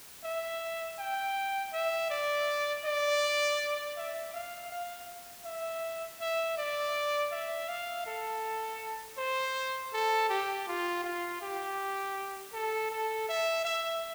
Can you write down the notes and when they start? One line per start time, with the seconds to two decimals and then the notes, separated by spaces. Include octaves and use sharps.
0.24 E5
0.99 G5
1.73 E5
2.10 D5
2.85 D5
3.97 E5
4.34 F5
4.70 F5
5.45 E5
6.20 E5
6.58 D5
7.32 E5
7.68 F5
8.06 A4
9.17 C5
9.93 A4
10.30 G4
10.68 F4
11.04 F4
11.41 G4
12.53 A4
12.91 A4
13.28 E5
13.65 E5